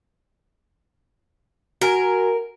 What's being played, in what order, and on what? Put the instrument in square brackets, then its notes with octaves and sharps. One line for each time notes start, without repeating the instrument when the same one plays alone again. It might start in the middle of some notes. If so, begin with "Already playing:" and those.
[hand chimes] F#4 G#5 A#5 [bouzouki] A#4